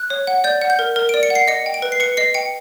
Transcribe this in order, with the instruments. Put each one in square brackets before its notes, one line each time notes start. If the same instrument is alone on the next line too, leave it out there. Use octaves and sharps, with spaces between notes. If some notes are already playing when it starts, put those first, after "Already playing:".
Already playing: [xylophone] F#6
C#5
F#5
D5 G6
F#5
G6
A#4
A#4
D7
D5
C#7
F#5 C7
D#5 C#7
G5
D7
B4
C7
B4 C#7
D#5 C7
G5 C#7